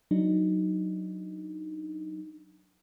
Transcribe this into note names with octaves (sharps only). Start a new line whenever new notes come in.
F#3 D4 D#4